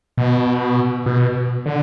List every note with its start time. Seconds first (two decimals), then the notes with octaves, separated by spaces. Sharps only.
0.18 B2
1.06 B2
1.66 D3